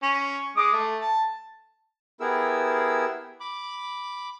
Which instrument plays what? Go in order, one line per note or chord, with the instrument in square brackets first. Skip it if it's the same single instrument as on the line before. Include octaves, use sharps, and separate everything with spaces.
[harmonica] C#4
G#3 D6 D#6
A3
A5
[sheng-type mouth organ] B3 E4 G4 G#4 A#4 E6
B5 D6